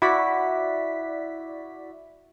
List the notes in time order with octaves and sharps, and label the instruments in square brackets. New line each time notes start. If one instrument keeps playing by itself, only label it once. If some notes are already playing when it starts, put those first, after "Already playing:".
[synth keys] E4 F#4 D5 B6